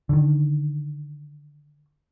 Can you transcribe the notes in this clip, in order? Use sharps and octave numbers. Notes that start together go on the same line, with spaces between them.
D3 D#3